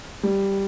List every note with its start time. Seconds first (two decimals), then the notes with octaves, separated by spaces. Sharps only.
0.23 G3